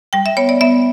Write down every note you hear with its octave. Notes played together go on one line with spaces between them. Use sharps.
G3 G5
E5
B3 C#5
D5
B3 E5